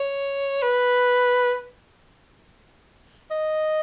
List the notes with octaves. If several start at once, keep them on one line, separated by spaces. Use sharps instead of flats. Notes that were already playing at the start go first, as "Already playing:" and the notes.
Already playing: C#5
B4
D#5